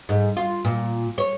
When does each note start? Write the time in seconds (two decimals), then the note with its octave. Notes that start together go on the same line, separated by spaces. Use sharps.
0.09 G#2
0.37 F4
0.65 A#2
1.18 C#5